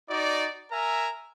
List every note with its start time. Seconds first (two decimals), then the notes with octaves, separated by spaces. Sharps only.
0.10 D#4 F#4 D5
0.72 A#4 E5 G#5 A#5